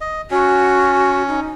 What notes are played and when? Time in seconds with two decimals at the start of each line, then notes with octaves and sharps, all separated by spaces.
0.01 D#5
0.31 C#4 F#4
1.28 D#4